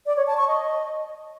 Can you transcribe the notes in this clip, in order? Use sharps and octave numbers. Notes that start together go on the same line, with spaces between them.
D5
C#5
A5
C#6
D#5